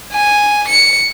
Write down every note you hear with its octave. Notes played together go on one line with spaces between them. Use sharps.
G#5
C#7